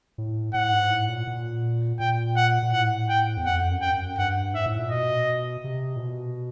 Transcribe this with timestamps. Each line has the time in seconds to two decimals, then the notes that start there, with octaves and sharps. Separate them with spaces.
0.18 A2
0.54 A2 F#5
0.72 G#2
0.90 A2
1.09 A#2
1.27 A#2
1.99 A#2 G5
2.37 F#5
2.62 A#2
2.72 A2 F#5
3.09 G5
3.37 E2
3.46 F2 F#5
3.70 F#2
3.81 G5
3.94 F#2
4.18 G2 F#5
4.53 G#2 E5
4.66 A2
4.79 A#2
4.91 B2 D#5
5.64 C3
5.96 A#2
6.00 B2